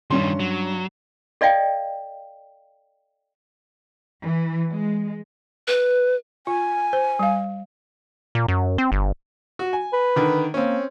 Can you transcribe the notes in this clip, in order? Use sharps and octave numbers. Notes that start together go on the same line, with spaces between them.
G2 D#3 G3 C#4 C6
F#3
A4 D5 D#5 F5 G5
E3
G#3
B4
F4 G#5
C5
G3 F5
A#2
F#2
C4
G1
F#4
G#5
B4
D3 D#3
A#3 C4 C#4